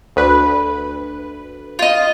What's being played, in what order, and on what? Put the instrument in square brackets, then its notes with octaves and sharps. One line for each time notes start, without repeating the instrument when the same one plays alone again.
[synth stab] D2 B4
[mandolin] F4 D#5